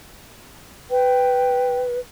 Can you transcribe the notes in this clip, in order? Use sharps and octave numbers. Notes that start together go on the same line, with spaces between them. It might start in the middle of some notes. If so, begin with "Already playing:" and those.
B4 G5